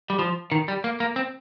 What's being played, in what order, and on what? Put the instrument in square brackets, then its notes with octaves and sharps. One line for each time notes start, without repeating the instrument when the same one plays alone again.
[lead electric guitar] G3
F3
D#3
G3
A#3
A#3
C4